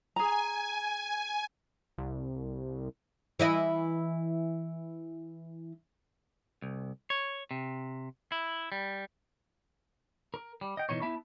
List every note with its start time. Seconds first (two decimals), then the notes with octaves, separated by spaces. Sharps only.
0.16 G#4 G#5 A#5
1.98 C2
3.39 E3 E4 D#5
6.62 C2
7.10 C#5
7.51 C3
8.32 E4
8.72 G3
10.34 A#4
10.61 G3
10.77 D#5 G5
10.89 B2 E3 D#4 C#5
11.02 B3 E4 E5 A5 B5